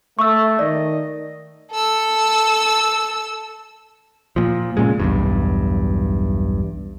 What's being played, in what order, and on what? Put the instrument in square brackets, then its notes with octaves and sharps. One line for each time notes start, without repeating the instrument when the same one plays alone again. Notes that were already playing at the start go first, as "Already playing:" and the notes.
[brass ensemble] A3 [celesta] C#6 E6
[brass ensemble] D#3 D#5 [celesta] D5
[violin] A4 E6
[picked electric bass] A#2 F3
A#2 C#3 G#3
B1 E2 G2